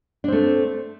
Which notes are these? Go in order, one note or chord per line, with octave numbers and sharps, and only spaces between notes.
A3 C4 D4